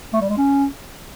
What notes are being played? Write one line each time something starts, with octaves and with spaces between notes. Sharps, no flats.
A3
G3
G#3
C#4